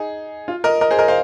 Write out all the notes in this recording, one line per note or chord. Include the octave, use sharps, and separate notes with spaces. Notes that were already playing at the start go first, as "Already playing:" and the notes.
Already playing: D#4 G#4
F4
A#4 D#5
A#4 D#5
G#4 C5
A#4 D#5
C5 F5